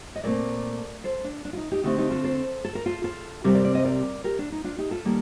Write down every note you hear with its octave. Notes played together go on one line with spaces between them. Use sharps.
D#5
A#2 A3 C4 A#4 D5
A4 C5
D4
D4
F4
D#4
D#4 G4
D3 A3 C4 D#4 G4
D#4 G4
F4 A4
A4 C5
A4
A#4
F4 A4
F4 A4
C3 G3 C4 G4 A#4
A#4 D5
A#4 D5
C5 D#5
A#4 D5
G4 A#4
D4
D#4
D4 F4
D#4 G4
F4 A4
D#3 G3 A#3